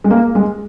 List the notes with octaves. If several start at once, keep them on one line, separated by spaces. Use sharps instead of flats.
G#3
A#3
G#3